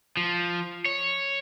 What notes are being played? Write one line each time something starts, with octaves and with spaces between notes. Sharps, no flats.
F3
C#5